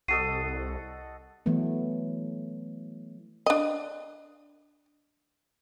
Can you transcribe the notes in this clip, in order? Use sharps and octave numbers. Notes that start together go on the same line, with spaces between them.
C2 F#4 A4 D#5 C7 D#7
E3 F#3 A3 B3
D4 D#5